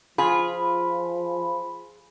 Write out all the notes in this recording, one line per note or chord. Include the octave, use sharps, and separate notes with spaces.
F3 F4 G#4 B5